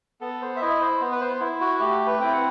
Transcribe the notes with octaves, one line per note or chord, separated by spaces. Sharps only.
B3 A4
C5
E5
E4 D#5
C5
B3
B4
C5
E4
F#4
A3 G4
B4
C4 E4 G5
F#5